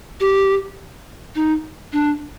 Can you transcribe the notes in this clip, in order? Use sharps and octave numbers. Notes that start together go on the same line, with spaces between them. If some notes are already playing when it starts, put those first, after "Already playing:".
G4
D#4
D4